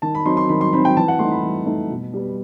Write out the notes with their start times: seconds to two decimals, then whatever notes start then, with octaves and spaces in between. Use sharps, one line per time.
0.02 D#3 A5
0.15 B5
0.25 F#3 C4 D#4 C6
0.37 C6
0.49 D#3 B5
0.61 C6
0.72 F#3 C4 D#4 B5
0.85 G5
0.97 E3 A5
1.08 F#5
1.19 A3 D#4 C6
1.31 B5
1.43 E3
1.66 A3 D#4
1.90 B2
2.14 G3 B3